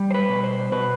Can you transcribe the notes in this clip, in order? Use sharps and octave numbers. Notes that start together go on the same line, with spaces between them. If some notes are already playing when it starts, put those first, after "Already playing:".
Already playing: G3
C5
B4
B2
C5
B2 B4